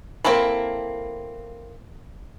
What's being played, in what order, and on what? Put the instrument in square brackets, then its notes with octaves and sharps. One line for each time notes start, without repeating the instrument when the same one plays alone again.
[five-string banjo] A#3 C4 E4 A4 B5